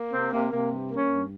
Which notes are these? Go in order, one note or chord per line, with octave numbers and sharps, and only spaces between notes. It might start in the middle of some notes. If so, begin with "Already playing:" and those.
Already playing: A#3
C3 C4
C3 A#3
C3 A#3
G2
A#3
C#4
G2